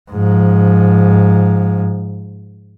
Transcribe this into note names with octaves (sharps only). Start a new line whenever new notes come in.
G#2 F3